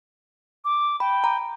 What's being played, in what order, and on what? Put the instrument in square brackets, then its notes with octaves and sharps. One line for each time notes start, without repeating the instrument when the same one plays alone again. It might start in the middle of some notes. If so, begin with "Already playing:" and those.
[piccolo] D6
[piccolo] G5 [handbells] B5
[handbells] A#5